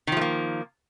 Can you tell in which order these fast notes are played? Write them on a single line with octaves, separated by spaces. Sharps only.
D#3 F3 A3 A#3